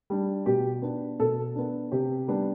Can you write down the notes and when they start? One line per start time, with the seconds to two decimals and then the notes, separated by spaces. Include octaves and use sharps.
0.10 G3 D4
0.46 B2 G4
0.82 B3 D4
1.20 B2 A4
1.55 B3 D4
1.92 C3 G4
2.28 G3 B3 D4